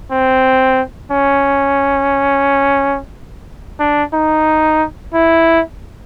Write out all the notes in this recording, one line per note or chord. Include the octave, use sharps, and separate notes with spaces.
C4
C#4
D4
D#4
E4